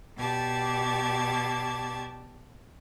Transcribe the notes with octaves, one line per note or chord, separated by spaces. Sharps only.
B2 G4 D5 A5 G#6